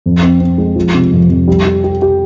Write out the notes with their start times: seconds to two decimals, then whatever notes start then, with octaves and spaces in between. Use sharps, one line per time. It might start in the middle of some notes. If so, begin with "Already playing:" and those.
0.06 F2
0.22 C4
0.40 C4
0.58 G#3
0.76 F3
0.94 C3
1.13 F2
1.30 F2
1.48 G3
1.66 G4
1.84 G4
2.02 G4